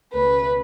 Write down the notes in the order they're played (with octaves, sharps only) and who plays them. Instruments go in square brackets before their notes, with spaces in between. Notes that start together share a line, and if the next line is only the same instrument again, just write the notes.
[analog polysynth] C#2 B2 A3 C#4 [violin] B4